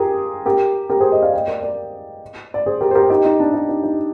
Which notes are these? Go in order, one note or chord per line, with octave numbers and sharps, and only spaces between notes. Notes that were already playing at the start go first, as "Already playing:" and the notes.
Already playing: F4 G4 G#4 A#4
G4 A#4
G4 A#4
G#4 C5
C5 D#5
D5 F5
D#5 G5
A#4 D5
A#4 D5
D5
G#4 C5
G4 A#4
C5
G4 A#4
D#4 G4
D#4
D4
D#4
D#4
D#4